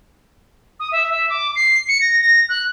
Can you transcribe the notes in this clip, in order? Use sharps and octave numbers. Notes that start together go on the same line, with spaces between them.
D#6
E5
E5
D6
C7
C#7
A#6
A#6
F#6